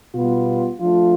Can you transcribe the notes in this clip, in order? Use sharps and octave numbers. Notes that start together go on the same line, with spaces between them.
B2 G3 B3 F4
F3 A3 D4 F4